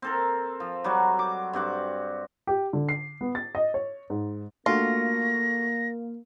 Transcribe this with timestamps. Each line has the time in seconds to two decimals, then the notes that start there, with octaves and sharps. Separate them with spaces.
0.02 C4 A4 A#4
0.60 F3
0.84 F#3 G3 F#4
1.19 D6
1.53 G2 C4 F#4 D6
2.47 G4
2.73 D3
2.89 C7
3.21 B3
3.35 A6
3.55 D#5
3.74 C#5
4.10 G#2
4.66 A3 A#3 D4 F4 F#4 A#6